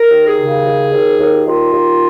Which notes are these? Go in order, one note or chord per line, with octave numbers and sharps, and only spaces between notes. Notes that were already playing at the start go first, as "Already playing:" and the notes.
Already playing: A#4
D#2
G#4
C#3
D#2
D#2
D#2
D#2 F4
D#2